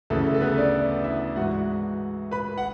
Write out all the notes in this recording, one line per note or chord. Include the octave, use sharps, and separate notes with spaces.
D2 C#3 E3 A4
A4
B3 B4
D4 D5
E4 E5
G#2 E3 F#4 F#5
B4 B5
F#5